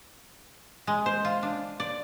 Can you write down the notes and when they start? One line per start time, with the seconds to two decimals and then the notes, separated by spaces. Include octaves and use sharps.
0.87 G#3
1.06 C5
1.25 F4
1.43 D4
1.80 D5